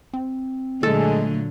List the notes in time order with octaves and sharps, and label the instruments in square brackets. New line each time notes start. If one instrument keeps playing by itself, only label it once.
[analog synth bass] C4
[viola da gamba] A#2 D3 F#3 [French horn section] G#3 [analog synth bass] A3 [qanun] A4